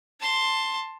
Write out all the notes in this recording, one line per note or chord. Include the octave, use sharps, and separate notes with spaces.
A5 C6